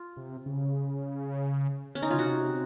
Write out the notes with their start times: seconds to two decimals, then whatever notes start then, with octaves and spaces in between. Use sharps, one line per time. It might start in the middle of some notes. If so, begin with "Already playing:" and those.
Already playing: F4
0.17 C3
0.46 C#3
1.95 C#4
2.02 D#4
2.10 C#3 F4
2.19 C3 F#4